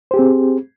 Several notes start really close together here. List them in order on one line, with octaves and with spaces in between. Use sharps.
C5 G4 G#4 C4